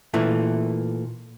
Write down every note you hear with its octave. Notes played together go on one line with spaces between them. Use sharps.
A#2 E3 A3